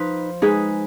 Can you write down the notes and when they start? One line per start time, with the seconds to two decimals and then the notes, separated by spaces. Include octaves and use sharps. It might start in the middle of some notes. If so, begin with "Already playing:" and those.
Already playing: F3 D#4 B4
0.42 G#3 D#4 G#4 B4